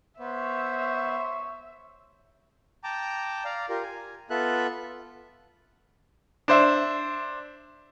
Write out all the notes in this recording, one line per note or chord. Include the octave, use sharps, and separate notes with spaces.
B3 C5 C#5 E5
G5 A5 A#5 D6
D5 F5 A#5
F4 G4 A#4
G#5
B3 F4 A4 E5 F#6
D4 C5 E5